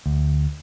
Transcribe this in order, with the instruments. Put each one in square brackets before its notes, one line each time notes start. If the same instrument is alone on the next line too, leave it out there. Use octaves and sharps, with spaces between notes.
[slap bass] D2